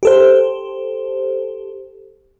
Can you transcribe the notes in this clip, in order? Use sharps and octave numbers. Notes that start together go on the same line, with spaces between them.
G4 A4 C5